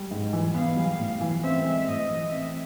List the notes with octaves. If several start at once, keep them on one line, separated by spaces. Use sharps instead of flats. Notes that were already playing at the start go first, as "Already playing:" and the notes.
Already playing: G3
G#2
E3
B3 F5
G3
A2
E3
C4 E5
G#3
A2 D#5
E3
C4 E5